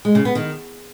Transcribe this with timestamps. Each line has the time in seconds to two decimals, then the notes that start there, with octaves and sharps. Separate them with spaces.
0.05 G#3
0.15 C#3
0.25 B3
0.35 D#3